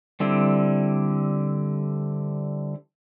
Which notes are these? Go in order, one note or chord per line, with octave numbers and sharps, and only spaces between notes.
D3 G3 C4 E4